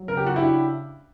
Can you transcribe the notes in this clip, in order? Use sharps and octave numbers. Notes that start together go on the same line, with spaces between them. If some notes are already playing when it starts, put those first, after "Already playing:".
Already playing: F#3
C#3 A#4
G4
F#4
D4 E4 G4